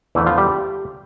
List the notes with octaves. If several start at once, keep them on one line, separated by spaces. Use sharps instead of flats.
E2 D3 E3 F3 A3 E4
F3 F4
G3 G4